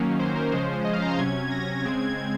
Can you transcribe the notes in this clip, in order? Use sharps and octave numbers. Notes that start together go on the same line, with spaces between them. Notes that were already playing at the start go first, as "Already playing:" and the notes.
Already playing: D#3 F#3 A#3 C#4
C5
A#4
C#3 F3 G#3 C#4 C5
D#5
F5
A#5
C6
C3 F#3 C#4 G#6
A#6
C#3 G#3 C4 G#6
G#6
G#6